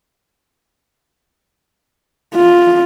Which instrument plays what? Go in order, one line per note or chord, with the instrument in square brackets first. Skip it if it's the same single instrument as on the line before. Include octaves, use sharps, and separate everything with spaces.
[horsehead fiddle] F4